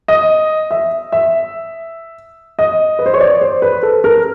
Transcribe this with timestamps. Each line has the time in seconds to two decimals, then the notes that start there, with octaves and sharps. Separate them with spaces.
0.08 D#5
0.71 E5
1.12 E5
2.59 D#5
2.99 B4
3.06 C5
3.14 C#5
3.21 D5
3.41 C5
3.62 B4
3.83 A4
4.04 A#4